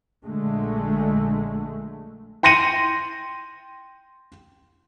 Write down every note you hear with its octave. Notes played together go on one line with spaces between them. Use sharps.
A#1 D3 G#3 A3
G5 C6 A#6 C#7 D#7